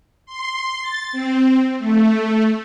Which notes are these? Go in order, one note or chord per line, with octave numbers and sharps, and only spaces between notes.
C6
A6
C4
A3